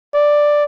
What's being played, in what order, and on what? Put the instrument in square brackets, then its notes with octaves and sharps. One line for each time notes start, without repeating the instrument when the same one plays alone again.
[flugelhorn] D5